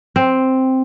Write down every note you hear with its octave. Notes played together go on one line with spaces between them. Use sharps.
C4